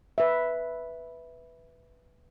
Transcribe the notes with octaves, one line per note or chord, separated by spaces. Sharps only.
B4 E5